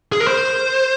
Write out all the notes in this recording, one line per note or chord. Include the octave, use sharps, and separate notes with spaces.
G#4
A#4
C5